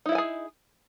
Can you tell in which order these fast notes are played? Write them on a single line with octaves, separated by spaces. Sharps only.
D#4 E4 E5 G#5 G#4